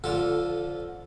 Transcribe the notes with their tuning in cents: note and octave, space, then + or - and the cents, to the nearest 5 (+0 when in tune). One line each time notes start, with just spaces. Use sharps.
D3 -20 F3 +0 A4 +0